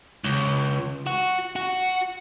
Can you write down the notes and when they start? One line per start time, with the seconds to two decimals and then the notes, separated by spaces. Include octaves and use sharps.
0.24 C#2
1.07 F#4
1.56 F#4